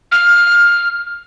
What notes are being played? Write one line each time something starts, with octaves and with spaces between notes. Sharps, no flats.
F6